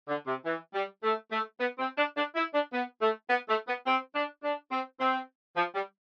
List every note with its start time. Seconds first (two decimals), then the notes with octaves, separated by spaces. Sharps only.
0.08 D3
0.27 C3
0.46 E3
0.74 G3
1.03 A3
1.31 A3
1.59 B3
1.78 C4
1.97 D4
2.16 D4
2.35 E4
2.54 D4
2.73 B3
3.01 A3
3.29 B3
3.49 A3
3.67 B3
3.87 C4
4.15 D4
4.43 D4
4.71 C4
5.00 C4
5.56 F3
5.75 G3